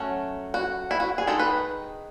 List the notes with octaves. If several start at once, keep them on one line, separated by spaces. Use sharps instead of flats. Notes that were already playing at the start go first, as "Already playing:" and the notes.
Already playing: F#3 A3 C#4 F#4
F#4
E4
F#4
G#4
D#3 G#3 D#4 A4
B4